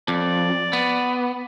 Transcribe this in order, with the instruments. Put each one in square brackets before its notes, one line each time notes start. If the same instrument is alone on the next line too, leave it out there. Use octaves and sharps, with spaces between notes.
[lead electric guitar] F2 [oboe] D5
[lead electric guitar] B3